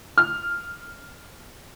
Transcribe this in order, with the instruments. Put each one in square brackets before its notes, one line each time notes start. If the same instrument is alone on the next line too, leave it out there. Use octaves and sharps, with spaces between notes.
[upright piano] F6